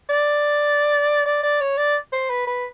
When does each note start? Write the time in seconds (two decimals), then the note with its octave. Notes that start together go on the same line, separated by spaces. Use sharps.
0.10 D5
1.26 D5
1.43 D5
1.61 C#5
1.78 D5
2.13 C5
2.30 B4
2.47 B4